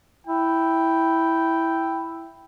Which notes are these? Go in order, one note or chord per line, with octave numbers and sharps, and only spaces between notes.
E4 G5